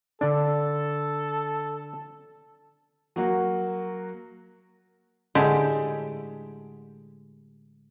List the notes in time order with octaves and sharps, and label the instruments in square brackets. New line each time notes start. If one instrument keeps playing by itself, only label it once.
[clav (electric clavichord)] D3 D4 [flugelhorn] A4
[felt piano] F#3 A#3 F#4
[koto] A2 D3 G#3 G4 E5